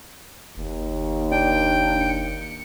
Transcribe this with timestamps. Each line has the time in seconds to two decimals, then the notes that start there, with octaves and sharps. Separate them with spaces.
0.57 F#1 D#2
1.31 D4 G5
2.01 C#7